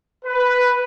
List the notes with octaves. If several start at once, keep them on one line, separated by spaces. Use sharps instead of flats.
B4